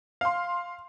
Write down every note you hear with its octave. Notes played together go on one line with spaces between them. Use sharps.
F5 C6